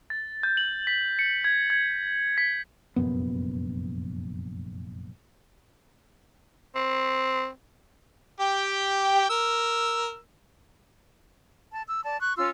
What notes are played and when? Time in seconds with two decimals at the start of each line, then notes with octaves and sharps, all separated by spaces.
0.10 A6
0.43 G6
0.57 F#7
0.87 B6
1.19 C#7
1.44 G#6
1.70 G#6
2.38 B6
2.96 F1 A#1 F#2 B3
6.76 C4
8.40 G4 G5
9.30 A#4 E6
11.74 A5
11.88 E6
12.04 D5 A5
12.20 C#6 F#6
12.37 C#4 F4 C6 E6